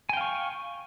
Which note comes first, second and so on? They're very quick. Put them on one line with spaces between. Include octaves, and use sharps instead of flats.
G#5 G5 F5 C#6